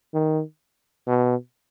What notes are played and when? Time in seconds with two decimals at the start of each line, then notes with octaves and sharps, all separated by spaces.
0.14 D#3
1.07 B2